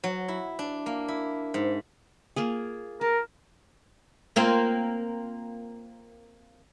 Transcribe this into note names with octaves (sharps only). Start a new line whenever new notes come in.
F#3
E4
D4
A#3
E4
G#2
A#3 F4 G#4
A#4 A5
A#3 C4 F4